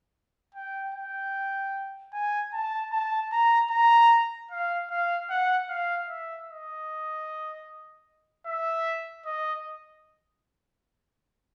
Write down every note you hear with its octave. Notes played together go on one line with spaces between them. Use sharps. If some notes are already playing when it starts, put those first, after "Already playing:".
G5
G5
G#5
A5
A5
A#5
A#5
F5
F5
F#5
F5
E5
D#5
E5
D#5